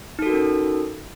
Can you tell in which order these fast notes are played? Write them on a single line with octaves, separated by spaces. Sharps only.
D#4 A4 F#4 A#4 C#4